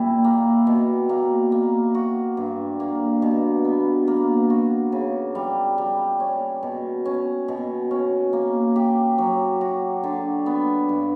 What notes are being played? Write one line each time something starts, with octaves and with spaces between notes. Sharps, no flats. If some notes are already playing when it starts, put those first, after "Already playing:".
Already playing: A#2 G3 E4
A#3
B2
A#3
A#3
F#4
G2
A#3
B2
B3
A#3
F#4
C#3
G3
G3
C#4
B2
C#4
B2
C#4
A#3
G4
F#3
F#4
D3
B3
G2